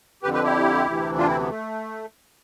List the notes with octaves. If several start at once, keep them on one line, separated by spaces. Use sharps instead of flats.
F2 D3 G4 B4
G4 B4
E4 G4
D2 C3 E3
D4 F4
C4 E4
B3
A3